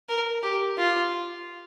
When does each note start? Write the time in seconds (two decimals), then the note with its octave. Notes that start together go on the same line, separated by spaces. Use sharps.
0.09 A#4
0.43 G4
0.78 F4